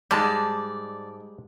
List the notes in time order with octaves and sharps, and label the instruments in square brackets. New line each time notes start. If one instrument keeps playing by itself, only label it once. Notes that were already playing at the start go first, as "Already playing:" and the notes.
[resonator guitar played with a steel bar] G#2 A5 [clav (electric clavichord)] G3 G#3 [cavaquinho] D5